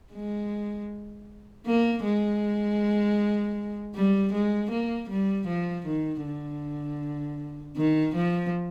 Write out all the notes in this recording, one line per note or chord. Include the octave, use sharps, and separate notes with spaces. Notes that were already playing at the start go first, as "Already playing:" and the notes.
G#3
A#3
G#3
G3
G#3
A#3
G3
F3
D#3
D3
D#3
F3